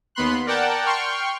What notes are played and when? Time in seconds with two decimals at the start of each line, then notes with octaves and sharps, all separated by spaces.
0.15 D#2 B3 B5 C6 F#6
0.46 A#4 D5 F#5 G5 A5
0.86 G5 C6 C#6 F6